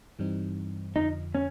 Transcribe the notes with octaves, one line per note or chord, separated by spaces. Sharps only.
G2 E3 G3 C4 D#4
F2 D3 F3 D#4
C#4